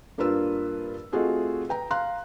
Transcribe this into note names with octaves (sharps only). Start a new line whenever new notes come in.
G2 A#3 D4 F4 B4 E6
A3 C4 F4 F#4 G#4 D#5
B4 G5 A#5
F5 A#5 C6 F#6